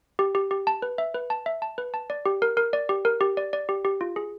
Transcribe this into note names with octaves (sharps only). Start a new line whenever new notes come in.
G4
G4
G4
A5
B4
E5
B4
A5
E5
A5
B4
A5
D5
G4
A#4
A#4
D5
G4
A#4
G4
D5
D5
G4
G4
F4
G#4